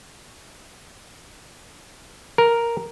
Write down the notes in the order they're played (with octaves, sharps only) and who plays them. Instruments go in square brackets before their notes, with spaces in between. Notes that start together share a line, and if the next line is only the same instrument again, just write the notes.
[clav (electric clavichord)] A#4